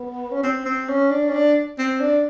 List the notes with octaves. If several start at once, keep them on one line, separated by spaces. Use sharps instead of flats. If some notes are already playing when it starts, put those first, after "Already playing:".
Already playing: B3
C#4
C4
C4
C#4
D4
C#4
D4
C4
D4